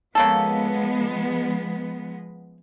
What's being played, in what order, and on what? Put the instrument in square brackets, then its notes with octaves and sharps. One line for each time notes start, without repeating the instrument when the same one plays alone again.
[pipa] C#3 A#3 A4 [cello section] F3 G#3 B3